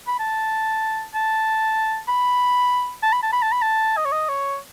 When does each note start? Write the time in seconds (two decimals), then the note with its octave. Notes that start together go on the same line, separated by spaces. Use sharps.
0.07 B5
0.19 A5
1.14 A5
2.08 B5
3.03 A5
3.12 B5
3.23 A5
3.32 B5
3.43 A5
3.52 B5
3.62 A5
3.97 D#5
4.05 C#5
4.12 D#5
4.29 C#5